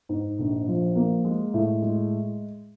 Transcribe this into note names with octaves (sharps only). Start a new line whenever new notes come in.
G#2
A#1
F3
A#3
G#3
A2
G#3